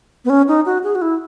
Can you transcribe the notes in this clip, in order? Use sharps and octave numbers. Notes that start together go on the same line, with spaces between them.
B3
C#4
D#4
F#4
G#4
F#4
E4